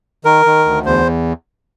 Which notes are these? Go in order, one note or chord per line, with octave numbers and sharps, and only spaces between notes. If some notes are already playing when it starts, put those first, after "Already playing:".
D#3 A#4
D#3
D2
E2 C5